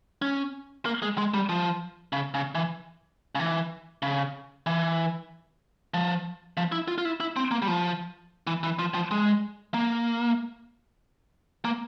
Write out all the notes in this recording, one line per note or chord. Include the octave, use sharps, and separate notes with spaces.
C#4
A#3
G#3
G#3
G3
F3
C#3
C#3
E3
C#3
E3
C#3
E3
F3
F3
E4
F4
F4
E4
E4
C4
A#3
G3
F3
E3
E3
F3
F3
G#3
A#3
A#3